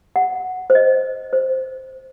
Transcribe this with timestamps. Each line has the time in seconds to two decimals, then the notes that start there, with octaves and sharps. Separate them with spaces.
0.16 F#5
0.70 C5
0.75 D#5
1.33 C5